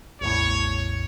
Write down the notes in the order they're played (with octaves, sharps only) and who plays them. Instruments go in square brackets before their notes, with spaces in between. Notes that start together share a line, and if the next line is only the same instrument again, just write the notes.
[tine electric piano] A1 E2 A2 [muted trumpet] C#5